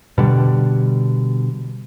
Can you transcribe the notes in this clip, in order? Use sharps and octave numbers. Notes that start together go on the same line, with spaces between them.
B2 D3 G3